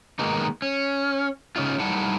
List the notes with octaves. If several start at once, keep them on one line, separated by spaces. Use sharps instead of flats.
D#3 G#3 A#3 B3 D#4
C#4
C#3 C#4 D#4 F4
G3 D#4 E4 F#5 A5